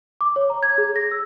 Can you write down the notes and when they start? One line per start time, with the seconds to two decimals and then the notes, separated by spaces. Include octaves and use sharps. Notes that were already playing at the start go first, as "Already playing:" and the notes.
0.21 D6
0.36 C#5
0.50 A#5
0.63 G#6
0.78 G#4
0.96 A#6
1.11 E6